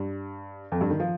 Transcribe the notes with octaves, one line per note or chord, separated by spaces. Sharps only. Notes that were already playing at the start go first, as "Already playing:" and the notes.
Already playing: G2
F2
G2
D#3
F3